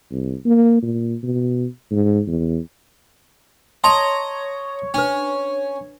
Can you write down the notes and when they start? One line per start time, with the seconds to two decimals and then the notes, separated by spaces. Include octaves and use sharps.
0.11 C2
0.45 A#3
0.83 A#2
1.23 B2
1.91 G#2
2.28 E2
3.84 C#5 D#5 A5 A#5 C6
4.94 C#4 D4 B4